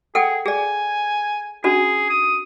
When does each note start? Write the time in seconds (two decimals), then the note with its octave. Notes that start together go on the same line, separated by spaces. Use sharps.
0.15 G#4 A4 F#5 G5
0.46 G#4 D5 G#5
1.64 C#4 D4 F#4 G#4
2.09 D#6